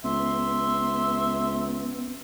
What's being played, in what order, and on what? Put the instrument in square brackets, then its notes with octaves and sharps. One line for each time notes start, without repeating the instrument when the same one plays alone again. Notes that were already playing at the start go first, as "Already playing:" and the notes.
[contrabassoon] C#2 [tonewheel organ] B3 [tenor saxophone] E5 [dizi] C6